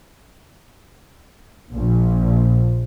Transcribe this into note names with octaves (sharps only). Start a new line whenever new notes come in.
A#1